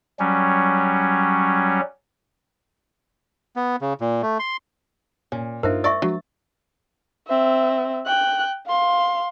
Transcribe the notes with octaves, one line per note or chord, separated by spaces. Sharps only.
F#3 G3 C#4
B3
C#3
A#2
A3
C6
A#2 C#4
G2 A#3 D4 D#4 F4 A#4 C5 E5
D5 E5 C#6 E6 A6
F3 F#3 G#3 D4
C4 E5
G5 F#6
F5 C6